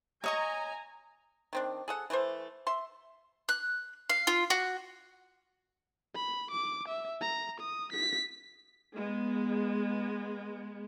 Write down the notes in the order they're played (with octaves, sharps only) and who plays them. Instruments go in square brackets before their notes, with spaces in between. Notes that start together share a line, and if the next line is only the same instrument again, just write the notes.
[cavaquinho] C#5 D#5 C#6 [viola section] G#5 A#5
[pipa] D#3 C4 D4
G#4 A4 F#5
E3 A3 A4 C5
E5 C6
[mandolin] F#6
F5
F4
F#4
[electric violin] B5
D6
E5
A#5
D#6
B6
[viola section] G#3 B3